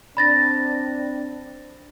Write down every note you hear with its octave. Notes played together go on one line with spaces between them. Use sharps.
C4 D4 B5 A6 A#6